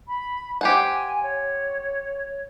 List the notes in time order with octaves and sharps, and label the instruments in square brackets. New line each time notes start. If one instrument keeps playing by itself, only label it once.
[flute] B5
[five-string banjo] G4 C5 F#5 [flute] G#5
[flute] C#5